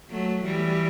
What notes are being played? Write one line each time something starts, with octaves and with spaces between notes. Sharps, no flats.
F#3 A3
E3 G3